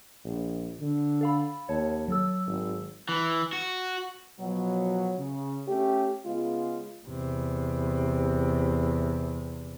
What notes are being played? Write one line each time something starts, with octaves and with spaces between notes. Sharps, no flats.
A#1
D3
A4 F5 B5
D#2 C#5 A5
F#3 A4 E6
G#1
E3
F#4
B2 F3 F#3
C#3
A3 C#4 G4
C#3 G#3 B3 F4
E2 C3